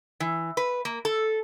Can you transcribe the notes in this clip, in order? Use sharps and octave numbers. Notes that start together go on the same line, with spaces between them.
E3
B4
A#3
A4